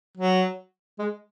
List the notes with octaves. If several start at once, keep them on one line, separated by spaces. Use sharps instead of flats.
F#3
G#3